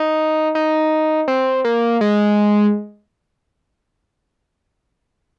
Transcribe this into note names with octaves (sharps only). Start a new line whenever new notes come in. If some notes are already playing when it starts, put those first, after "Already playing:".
Already playing: D#4
D#4
C4
A#3
G#3